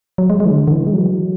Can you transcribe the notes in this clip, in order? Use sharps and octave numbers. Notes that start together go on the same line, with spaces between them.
F#3
G#3
G#3
E3
D3
D3
E3
G#3
F#3